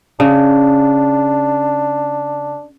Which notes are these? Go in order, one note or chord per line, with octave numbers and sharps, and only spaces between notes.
C#3 D4